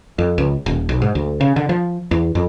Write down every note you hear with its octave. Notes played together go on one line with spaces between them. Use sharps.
F2
C#2
D#1
B1
G#2
D2
C#3
D3
F3
E2
F2